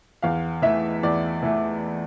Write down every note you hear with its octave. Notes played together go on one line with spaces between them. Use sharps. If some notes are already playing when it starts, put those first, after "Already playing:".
E2 F5
E3 A3 E5
E2 D5
E3 A3